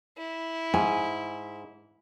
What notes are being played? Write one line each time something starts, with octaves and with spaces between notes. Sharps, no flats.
E4
G#2 G#5